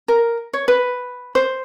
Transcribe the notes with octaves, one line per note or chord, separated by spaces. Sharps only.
A#4
C#5
B4
C5